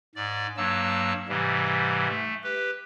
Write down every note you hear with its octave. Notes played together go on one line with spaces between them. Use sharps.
G#2 D5
G2 F#3 A#3 A5 E6
G#2 C3 E3 G3
A3
G4 B4